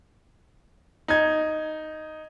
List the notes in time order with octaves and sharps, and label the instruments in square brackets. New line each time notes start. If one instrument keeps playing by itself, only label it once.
[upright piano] D#4 G#6